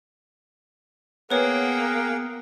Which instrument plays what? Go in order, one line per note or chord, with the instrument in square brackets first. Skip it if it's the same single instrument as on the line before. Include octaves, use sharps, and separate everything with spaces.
[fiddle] A#3 G5 [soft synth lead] B3 [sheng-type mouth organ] G#4 A#4 F#5 [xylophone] B4 C#5